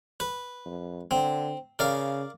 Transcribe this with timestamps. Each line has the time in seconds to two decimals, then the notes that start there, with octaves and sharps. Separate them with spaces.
0.20 B4
0.65 F2
1.11 D3 C4
1.79 C#3 A#4 D5 F5